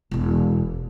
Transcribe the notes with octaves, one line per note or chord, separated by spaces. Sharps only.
E1 E2